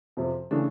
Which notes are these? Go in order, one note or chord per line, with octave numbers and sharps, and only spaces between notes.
F2 C3 F3
C#3 E3 A3 D4